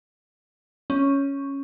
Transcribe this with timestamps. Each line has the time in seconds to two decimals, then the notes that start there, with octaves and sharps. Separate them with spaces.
0.90 C#4